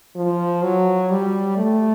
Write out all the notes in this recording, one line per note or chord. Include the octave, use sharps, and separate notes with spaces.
F3
F#3
G3
A3